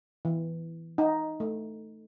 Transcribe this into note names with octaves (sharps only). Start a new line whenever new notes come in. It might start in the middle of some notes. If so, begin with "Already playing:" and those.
E3
D#4
A3